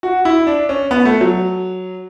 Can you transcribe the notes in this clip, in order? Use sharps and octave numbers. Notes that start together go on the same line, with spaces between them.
F#4
E4
D4
C#4
B3
A3
F#3